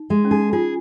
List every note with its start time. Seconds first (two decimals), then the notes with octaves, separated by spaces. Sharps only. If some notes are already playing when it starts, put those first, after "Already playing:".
Already playing: D#4
0.10 G#3
0.25 C#4
0.31 D#4 G#4
0.53 F4 G#4